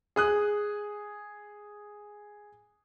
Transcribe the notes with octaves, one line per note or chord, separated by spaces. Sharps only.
G#4 D#6 F#6